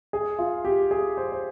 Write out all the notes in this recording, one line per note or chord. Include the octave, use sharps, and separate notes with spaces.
G#4
F4
G4
G#4
C5
C5